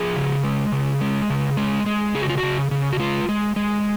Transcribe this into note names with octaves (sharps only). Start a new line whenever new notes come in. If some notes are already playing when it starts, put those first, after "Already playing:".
Already playing: F3 G#4
C#3
G#3
C#3
G#3
C#3
G#3
G#3
C#3 G#4
F#4
F4
F#4
C#3
C#3
F#4
G#3 F4
G#3
G#3